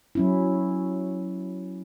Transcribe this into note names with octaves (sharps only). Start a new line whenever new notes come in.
F#3 C#4 E4